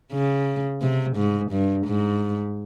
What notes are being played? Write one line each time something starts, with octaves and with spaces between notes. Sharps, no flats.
C#3
C3
G#2
G2
G#2